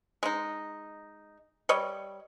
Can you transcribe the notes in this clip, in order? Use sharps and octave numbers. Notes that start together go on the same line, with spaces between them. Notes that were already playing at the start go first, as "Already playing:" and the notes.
G#3 D#4
G3 C#5 D#5